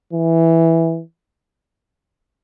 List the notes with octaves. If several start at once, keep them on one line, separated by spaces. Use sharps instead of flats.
E3